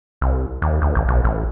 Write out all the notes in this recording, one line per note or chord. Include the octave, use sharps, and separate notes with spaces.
C2
D#2
D2
A1
B1
A1